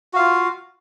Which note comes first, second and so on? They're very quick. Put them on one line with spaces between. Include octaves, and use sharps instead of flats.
F#4 F5 F4